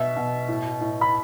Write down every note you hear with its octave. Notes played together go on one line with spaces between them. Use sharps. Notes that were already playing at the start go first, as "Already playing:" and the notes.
Already playing: B2 E5
B2
A2
A2
B5